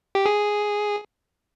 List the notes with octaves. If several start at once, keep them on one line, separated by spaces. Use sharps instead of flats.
G4
G#4